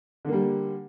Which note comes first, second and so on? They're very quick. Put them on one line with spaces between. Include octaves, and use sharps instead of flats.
D3 A#3 G3